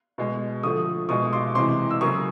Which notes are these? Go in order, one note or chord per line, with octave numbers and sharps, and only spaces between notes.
B2 G#3
D3 F3 A3 C#6 D#6
B2 G#3 C#6 D#6
C6 D6
C3 E3 G#3 C6 D6
E6
C#3 F#3 A#3 C#6 D#6